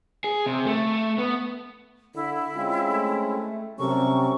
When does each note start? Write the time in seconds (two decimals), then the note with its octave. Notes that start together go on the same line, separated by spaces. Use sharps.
0.24 G#4
0.46 C3
0.66 A3
1.19 B3
2.14 D3 E4
2.55 G#3 C4 C#4 F4
2.91 A3
3.79 C3 F#3 G3 C#4 A4 A#4 C#6